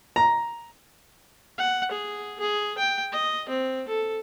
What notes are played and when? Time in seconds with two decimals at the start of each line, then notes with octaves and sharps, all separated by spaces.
0.16 A#5
1.58 F#5
1.91 G#4
2.40 G#4
2.78 G5
3.12 D#5
3.49 C4
3.88 A4